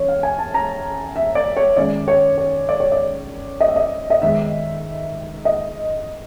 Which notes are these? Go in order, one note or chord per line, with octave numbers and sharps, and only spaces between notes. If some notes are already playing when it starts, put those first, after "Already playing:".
Already playing: E3 C#4 C#5
F5
G#5
A5
A#5
E5
D5
C#5
D#3 G#3 C#4 D5
C#5
C#5
D5
C#5
D5
D#5
E5
D#5
D#5
D#3 G#3 B3 E5
D#5